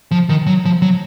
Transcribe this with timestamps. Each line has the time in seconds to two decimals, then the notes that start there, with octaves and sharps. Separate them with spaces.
0.11 F3
0.29 D#3
0.46 F#3
0.65 F3
0.82 F#3